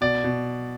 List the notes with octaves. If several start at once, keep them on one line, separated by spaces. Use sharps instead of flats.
B2 D5
B2